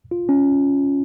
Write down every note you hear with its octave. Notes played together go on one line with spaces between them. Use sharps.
F4
C#4